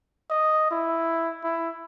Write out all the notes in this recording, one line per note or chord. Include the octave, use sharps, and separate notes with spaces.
D#5
E4
E4